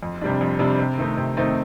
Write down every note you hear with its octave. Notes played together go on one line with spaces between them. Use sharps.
F2
C3 G3 D4
F2
C3 G3 D4
C3
D#3 A3 C4 D#4
C3
D#3 A3 C4 D#4